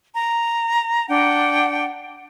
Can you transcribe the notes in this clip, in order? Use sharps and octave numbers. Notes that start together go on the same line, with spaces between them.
A#5
D4 F#5 G5